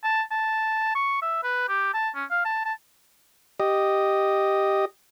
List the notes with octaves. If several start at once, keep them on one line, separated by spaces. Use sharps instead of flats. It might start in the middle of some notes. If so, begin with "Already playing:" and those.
A5
A5
C#6
E5
B4
G4
A5
C#4
F5
A5
A5
G4 D#5